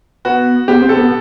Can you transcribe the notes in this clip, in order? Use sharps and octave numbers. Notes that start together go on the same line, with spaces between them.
B3 F#4
B3 G4
C4
A4
B3